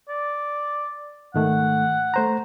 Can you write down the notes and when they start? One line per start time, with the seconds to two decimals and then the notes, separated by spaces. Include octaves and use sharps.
0.09 D5
1.34 G#2 D#3 A3 F#5
2.14 A3 C5 A#5